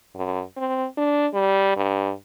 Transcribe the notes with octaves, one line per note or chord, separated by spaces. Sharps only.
F#2
C4
D4
G3
G2